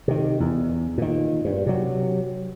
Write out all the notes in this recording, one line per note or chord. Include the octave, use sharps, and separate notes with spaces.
C3 D#3
E2
A#2 D#3
G2
C3 F#3